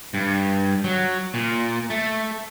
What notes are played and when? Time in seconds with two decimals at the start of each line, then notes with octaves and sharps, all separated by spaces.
0.14 G2
0.84 F#3
1.34 A#2
1.90 A3